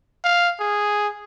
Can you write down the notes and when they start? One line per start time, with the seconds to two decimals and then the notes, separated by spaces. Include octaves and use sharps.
0.24 F5
0.60 G#4